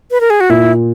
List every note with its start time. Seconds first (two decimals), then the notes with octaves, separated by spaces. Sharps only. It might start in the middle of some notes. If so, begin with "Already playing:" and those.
0.11 B4
0.21 A#4
0.30 G#4
0.40 F#4
0.49 A#2 E4